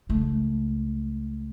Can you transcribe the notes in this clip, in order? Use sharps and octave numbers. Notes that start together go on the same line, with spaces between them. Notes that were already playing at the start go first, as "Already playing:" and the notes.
C#2 A3